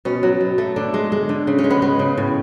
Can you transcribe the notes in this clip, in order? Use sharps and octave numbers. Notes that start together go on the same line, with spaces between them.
B2 C#4
F#3
B2
A3
D3 D4
G#3
G#3
D3
C#3
C#4
G#3
B3
G#3 B3
C#3
A2